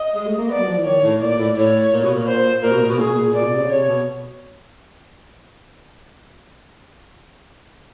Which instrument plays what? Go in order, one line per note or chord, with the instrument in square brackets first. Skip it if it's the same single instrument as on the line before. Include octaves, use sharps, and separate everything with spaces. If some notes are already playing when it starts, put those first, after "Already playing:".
Already playing: [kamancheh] D#5
[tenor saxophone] G#3
A3
A#3
[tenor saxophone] B3 [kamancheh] D5
[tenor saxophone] F#3
F3
E3
[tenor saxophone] D#3 [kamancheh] C#5
[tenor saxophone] A2
[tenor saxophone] A#2 [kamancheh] D5
[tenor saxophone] A2
[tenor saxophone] A2 [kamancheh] C#5
[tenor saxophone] A#2
B2
A#2
[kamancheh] C5
[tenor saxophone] A#2 [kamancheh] A#4
[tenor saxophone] B2
A#2
B2
[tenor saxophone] A#2 [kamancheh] G#4
[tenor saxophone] B2
A#2
[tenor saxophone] A#2 [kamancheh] D5
[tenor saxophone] B2
C3
C#3
[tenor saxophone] C3 [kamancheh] C#5
[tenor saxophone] B2